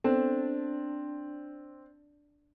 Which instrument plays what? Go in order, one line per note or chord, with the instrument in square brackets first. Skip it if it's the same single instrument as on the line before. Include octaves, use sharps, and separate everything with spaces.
[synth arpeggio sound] B3 A4 [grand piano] C4 [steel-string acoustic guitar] D4